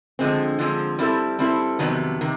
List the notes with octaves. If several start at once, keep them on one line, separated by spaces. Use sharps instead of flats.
D3 F3 G#3 C4
D3 F3 G#3 C4
G3 C4 E4 A4
G3 C4 E4 A4
F2 C3 D#3 F#3 B3
C3 D#3